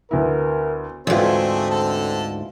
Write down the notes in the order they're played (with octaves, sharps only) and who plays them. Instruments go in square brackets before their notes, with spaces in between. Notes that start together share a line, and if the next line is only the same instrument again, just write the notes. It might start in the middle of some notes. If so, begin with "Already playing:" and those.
[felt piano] D2 B3 E4 [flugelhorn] A#4
[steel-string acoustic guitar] D2 G#2 [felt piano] E3 F4 [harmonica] A3 D4 G#4 [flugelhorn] C4
[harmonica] D3 A4 A5